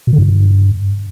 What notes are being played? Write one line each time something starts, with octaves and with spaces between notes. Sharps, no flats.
B2
D3
G2